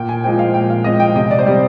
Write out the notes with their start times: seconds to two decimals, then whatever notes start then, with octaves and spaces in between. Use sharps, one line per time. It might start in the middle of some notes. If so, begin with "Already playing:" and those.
Already playing: A#2 G5
0.09 G#5
0.24 F3 G#3 C4 G5
0.39 F5
0.54 A#2 G5
0.70 F5
0.84 F3 G#3 C4 D#5
1.00 G5
1.15 C3 D#5
1.31 D5
1.39 C5
1.46 G3 C4 D5